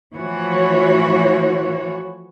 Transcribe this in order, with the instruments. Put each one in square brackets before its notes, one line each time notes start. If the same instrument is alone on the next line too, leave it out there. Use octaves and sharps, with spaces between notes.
[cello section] E3 F3 A3 F#4 C#5